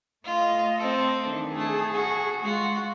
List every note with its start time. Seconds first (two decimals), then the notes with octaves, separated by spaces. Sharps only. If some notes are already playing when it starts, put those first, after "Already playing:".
0.24 A3 F4 D#5
0.76 C4 A4
1.24 D#3 E3 D4
1.55 A3 G#4 A5
1.93 F#4
2.43 G#3 F4 F#4